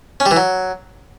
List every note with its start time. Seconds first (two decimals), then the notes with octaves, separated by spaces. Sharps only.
0.20 C#4
0.26 G3
0.31 E3
0.36 F#3